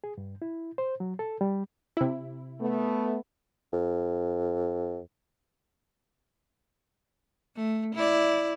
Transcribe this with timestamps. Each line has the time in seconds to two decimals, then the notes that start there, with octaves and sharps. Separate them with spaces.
0.04 G#4
0.18 G2
0.42 E4
0.78 C5
1.00 F#3
1.19 A4
1.41 G3
1.97 C3 E4
2.61 A3 B3
3.73 F2
7.56 A3
7.95 E4 D5